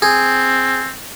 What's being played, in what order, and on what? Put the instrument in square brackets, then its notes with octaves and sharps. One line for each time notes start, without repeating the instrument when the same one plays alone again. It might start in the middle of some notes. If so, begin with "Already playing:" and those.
[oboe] C4 [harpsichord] G#4